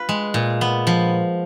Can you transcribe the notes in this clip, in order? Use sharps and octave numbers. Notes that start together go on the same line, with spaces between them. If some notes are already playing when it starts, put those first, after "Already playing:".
Already playing: F4 B4
G#3
A#2
B3
F3